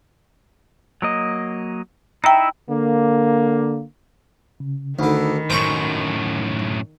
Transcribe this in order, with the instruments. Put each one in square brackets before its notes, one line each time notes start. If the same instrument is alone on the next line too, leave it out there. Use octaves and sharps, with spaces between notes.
[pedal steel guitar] F#3 A#3 D#5
[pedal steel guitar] D#4 E4 E5 [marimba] G5 A#5
[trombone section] D3 A#3
[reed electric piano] C#3
[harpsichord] D2 D3 [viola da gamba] D#3 [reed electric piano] D#4 B5
[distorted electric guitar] F#2 A2 [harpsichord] C5 A#5 C#6